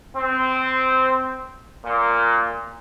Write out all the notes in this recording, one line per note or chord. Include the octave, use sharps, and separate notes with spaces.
C4
A#2